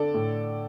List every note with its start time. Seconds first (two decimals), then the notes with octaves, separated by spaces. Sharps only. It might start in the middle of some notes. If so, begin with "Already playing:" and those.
Already playing: D3 A4 D5
0.14 A2